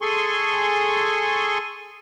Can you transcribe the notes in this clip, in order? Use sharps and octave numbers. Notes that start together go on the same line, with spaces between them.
G#4 A4 G#5 C6 C#6